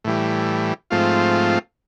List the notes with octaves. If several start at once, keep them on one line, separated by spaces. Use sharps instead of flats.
A2 E3 G3
G#2 F3 A3 C4 F4